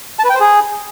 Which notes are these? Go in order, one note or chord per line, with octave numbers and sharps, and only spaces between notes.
A5
B4
G5
C5
G#4